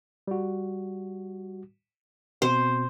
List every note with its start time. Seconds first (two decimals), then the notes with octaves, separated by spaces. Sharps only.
0.28 G3 F#4
2.42 B2 C4 C5